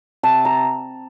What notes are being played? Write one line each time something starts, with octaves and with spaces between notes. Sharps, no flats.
C3 A5
A#5